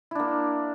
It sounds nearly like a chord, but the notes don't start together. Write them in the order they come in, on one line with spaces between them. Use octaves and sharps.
E4 D4 A#3